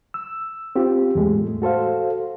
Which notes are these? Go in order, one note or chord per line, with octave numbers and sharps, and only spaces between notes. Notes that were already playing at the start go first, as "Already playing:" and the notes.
E6
C4 F4 G4
E2 A2 G#3 A3
F#4 A4 C5 F5